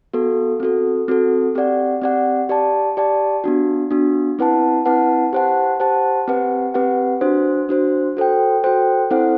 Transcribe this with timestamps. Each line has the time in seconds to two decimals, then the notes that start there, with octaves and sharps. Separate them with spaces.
0.14 B3 F#4 A4
0.60 C4 F#4 A4
1.08 C4 F#4 A4
1.55 C4 G4 D5 F#5
2.02 C4 G4 D5 F#5
2.49 G4 D5 A5
2.97 G4 D5 A5
3.44 B3 D4 F#4
3.91 B3 D4 F#4
4.39 C4 E4 B4 F#5 A5
4.86 C4 E4 B4 F#5 A5
5.33 G4 C5 F#5 A5
5.80 G4 C5 F#5 A5
6.28 C4 G4 B4 F#5
6.74 C4 G4 B4 F#5
7.21 D4 F#4 C5
7.69 D4 F#4 C5
8.17 F#4 A4 C5 G5
8.64 F#4 A4 C5 G5
9.10 C4 E4 A4 C5 F#5